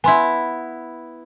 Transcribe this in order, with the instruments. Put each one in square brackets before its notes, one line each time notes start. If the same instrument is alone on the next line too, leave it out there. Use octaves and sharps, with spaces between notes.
[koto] B3 E4 [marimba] G#5 C6